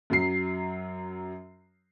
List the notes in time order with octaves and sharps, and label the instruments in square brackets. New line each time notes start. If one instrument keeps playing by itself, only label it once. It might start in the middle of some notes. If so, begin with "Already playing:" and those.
[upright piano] F#2 F#3 C7